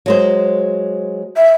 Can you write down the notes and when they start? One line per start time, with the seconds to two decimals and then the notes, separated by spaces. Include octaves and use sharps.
0.06 F#3 G#3 C5
1.36 E5